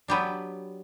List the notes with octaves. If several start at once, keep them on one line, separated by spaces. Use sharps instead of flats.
F#3 B3 D4 G4 B4